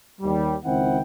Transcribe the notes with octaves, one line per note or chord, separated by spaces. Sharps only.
D#2 G3
C#2 D#3 C4 E4 F#5 G5